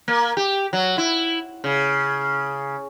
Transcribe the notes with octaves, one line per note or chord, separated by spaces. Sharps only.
A#3
G4
F#3
E4
C#3